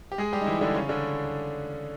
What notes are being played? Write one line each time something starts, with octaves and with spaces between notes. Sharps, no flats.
G4
G#3 G#4
G3 G4
D#4
E3 E4
D3 D4
C#3 C#4
D3 D4